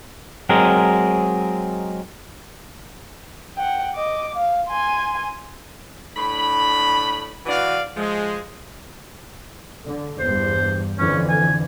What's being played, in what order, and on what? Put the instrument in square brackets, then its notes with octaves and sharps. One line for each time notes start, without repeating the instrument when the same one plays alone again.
[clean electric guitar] F#3 G#3 C4 G#4 A#4
[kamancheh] F#5 G5
D#5 D6
F5
G#5 C6
[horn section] A2 D4 B5
E3 F#4 B4 D5 F5
F3 G#3
[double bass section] D3
[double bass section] E2 G2 [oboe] C5
[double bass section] F2 D3 E3 [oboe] C#4
[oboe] G#5